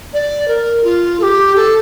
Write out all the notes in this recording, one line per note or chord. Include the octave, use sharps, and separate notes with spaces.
D5
A#4
F4
A4
G4
A4